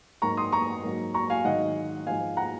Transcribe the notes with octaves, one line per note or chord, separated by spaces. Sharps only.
G#2 F#3 A#3 A#5 C#6
C6 D#6
A#5 C#6
G#2 F#3 A#3
A#5 C#6
F5 G#5
G#2 D#3 F#3 D#5 F#5
G#2 F3 G#3 F5 G#5
F#5 A#5